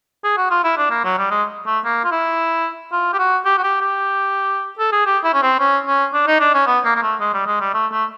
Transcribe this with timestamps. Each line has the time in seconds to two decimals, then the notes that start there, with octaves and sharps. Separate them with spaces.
0.24 G#4
0.37 F#4
0.51 F4
0.64 E4
0.77 D4
0.91 A#3
1.04 F#3
1.18 G3
1.31 G#3
1.67 A3
1.85 A#3
2.05 F4
2.11 E4
2.92 F4
3.13 G4
3.18 F#4
3.45 G4
3.58 F#4
3.64 G4
3.81 G4
4.79 A4
4.92 G#4
5.06 G4
5.24 E4
5.34 C#4
5.42 C4
5.59 C#4
5.87 C#4
6.13 D4
6.27 D#4
6.40 D4
6.54 C#4
6.67 B3
6.85 A#3
6.95 A#3
7.02 A3
7.20 G#3
7.34 G3
7.47 G#3
7.60 G3
7.74 A3
7.92 A3